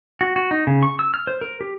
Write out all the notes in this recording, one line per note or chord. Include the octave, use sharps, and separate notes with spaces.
F#4
F#4
D#4
C#3
C#6
E6
F6
C5
A#4
G4